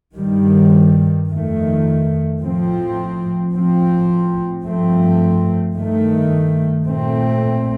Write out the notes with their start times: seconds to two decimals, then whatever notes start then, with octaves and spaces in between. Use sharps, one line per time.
0.16 G2 D#3 G3
1.28 F2 D#3 A3
2.40 A2 F3 C4
3.52 A2 F3 C4
4.64 G2 F3 A3 C4
5.75 G2 D#3 A3
6.86 A#2 A3 C4